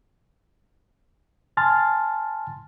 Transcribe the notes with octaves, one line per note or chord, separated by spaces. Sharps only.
G#5 A5 C6 F6 A6